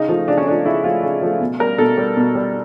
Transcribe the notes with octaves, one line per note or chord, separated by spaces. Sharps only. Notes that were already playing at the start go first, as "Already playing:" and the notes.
Already playing: C#3 D#4
F3 A3
C#3 D4
C#4
F3 A3 D4
C#3 E4
F3 A3 F4
C#3
F3 A3
B2
G3 A#4
B2 A4
G3
B2
G3